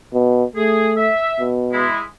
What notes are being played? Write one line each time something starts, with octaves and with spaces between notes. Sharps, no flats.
B2
A3 G#4
E5
B2
G#3 E4